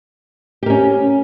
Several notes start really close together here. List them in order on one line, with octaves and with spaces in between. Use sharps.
G4 A#4 C#4